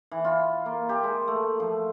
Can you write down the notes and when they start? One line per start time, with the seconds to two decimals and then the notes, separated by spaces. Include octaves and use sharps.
0.11 E3
0.25 F4
0.66 A#3
0.89 G4
1.04 G#3
1.28 A3
1.60 F3